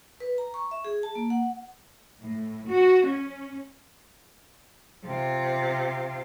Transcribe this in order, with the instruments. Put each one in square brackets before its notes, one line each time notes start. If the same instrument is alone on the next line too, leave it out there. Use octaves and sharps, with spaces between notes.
[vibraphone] B4
A#5
C#6
E5
G#4
A5
A#3
F#5
[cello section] A2
F#4
C#4
[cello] C3 F4